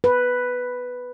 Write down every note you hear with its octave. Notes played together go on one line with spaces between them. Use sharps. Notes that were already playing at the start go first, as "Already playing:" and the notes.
B4